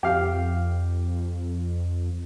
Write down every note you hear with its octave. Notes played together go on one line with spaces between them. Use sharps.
F2 G4 F5